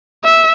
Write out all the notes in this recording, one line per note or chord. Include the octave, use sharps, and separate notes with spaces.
E5